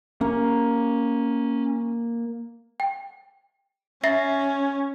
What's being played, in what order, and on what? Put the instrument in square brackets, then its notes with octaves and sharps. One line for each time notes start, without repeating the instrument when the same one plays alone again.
[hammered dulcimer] A#3 [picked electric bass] C#4
[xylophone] G5
[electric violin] C#4 [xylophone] E5 A#6 C7